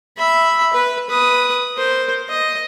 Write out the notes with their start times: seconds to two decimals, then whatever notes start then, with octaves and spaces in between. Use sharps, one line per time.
0.17 E5 B5
0.73 B4
1.09 B4 D#6
1.75 A#4 C5
2.29 D#5